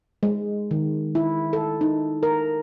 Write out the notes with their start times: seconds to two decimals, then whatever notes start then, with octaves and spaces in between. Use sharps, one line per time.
0.23 G#3
0.71 D#3
1.15 E4
1.53 A4
1.81 D#4
2.23 A#4